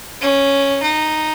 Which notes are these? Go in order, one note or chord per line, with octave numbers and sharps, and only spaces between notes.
C#4
D#4